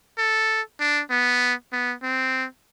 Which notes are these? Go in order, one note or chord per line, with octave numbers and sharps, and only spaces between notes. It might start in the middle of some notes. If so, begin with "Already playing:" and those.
A4
D4
B3
B3
C4